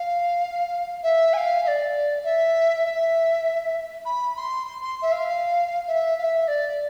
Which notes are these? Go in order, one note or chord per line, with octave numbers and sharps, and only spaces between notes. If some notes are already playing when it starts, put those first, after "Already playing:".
Already playing: F5
E5
G#5
F5
E5
D5
E5
E5
B5
C6
C6
C6
E5
F5
E5
F5
E5
D5